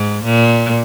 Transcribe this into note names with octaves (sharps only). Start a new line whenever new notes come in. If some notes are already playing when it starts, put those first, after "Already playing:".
Already playing: G#2
A#2